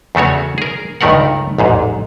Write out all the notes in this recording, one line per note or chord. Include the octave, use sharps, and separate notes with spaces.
E2 C#3 A3 F#4 C#5
G#4 A#4
C#2 G2 D#3 A3 A#4 F#5
A1 E2 G#2